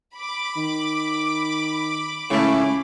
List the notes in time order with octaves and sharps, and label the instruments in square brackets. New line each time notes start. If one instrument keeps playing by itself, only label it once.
[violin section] B5 D6
[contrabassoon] D#3
[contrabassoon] C#2 [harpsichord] C#3 A3 [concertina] C#4 E4